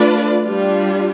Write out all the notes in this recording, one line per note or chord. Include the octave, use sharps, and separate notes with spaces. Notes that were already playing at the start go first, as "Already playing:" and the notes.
Already playing: A3 D4 F4 B4 D5
G3 D4 F4